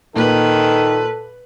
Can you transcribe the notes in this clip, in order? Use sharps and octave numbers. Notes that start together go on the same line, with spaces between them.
A#2 D#3 A4 B4